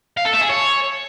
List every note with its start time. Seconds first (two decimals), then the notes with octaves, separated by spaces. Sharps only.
0.17 F5
0.25 A4
0.33 E5
0.41 G#4
0.49 C#5